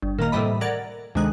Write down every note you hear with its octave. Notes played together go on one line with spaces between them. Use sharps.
G1
A#2 D#3 A#3
A2 C3 E3 G3 D#5 B5
A#4 D5 F#5 G#6 A6
D2 C3 D#3 G#3 F#6